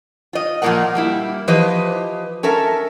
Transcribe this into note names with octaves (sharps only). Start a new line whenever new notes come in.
F4 D#5
A#2 F3 G3 A#3 A#4 F#5
G3 A#3 E4
E3 F3 G4 B4 C5 D#5
C#4 A4 A#4 E5